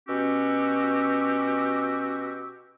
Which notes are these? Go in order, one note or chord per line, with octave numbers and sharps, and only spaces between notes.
B2 C#4 F#4 G4 E6